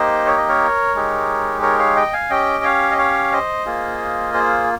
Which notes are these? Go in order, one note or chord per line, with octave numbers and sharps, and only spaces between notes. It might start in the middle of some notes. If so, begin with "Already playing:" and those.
Already playing: A#3 D#4 G4 C5 D#5
C#5
D#5
A#4 C#5
G#3 D#4 G4
A#4 C#5
C#5 F5
D#5 G5
F5 G#5
C#4 G4 D#5 G5
C#5 F5
D#5
C#5 F5
C5 D#5
A#3 F4 G#4
G#4 C5